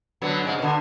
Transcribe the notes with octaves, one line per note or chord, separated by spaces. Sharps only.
D3 F#3 B3
G#2 C#3 G#3
B2 D3